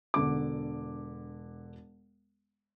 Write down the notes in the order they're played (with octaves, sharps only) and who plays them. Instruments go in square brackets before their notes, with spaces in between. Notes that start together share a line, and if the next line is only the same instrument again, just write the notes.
[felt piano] E1 D3 D6